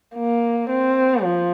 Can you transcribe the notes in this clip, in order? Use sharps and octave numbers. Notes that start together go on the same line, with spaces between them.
A#3
C4
F3